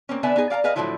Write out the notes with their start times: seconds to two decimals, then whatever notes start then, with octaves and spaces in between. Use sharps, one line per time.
0.09 A#3 C4 C#4
0.23 D3 B3 A4 D5 E5 G#5
0.36 B3 D#4 G#4
0.50 D5 F5 G#5 A#5
0.64 G#4 B4 D#5 F5
0.76 A2 D3 D#3 F3 F#3 E4